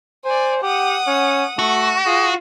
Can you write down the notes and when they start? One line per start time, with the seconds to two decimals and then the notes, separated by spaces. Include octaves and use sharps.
0.25 C5 D5 G#5
0.63 G4 F#5 D#6
1.07 C#4
1.59 A3 F#4
2.06 F4 G#4